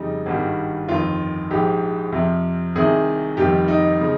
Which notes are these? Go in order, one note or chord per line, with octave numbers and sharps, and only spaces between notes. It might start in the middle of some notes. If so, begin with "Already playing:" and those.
Already playing: F2 C#3 G3 D#4
G#1 G2 D#3 G3
G1 F2 D#3 F4
A#1 G#2 F3 G4
F2 C3 F3
C2 C3 D#3 G#4
F1 F2 D#3 G3 G4
D#4
C#3 F3